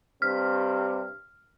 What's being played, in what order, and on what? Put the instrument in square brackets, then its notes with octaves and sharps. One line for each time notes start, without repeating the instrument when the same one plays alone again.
[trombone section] G2 C3 C4 [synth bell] F6